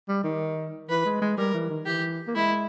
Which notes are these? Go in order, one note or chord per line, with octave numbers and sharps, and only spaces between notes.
G3
D#3
E3 B4
G#3
G#3
G3 A#4
E3
D#3
E3 G4
A#3
G#3 E4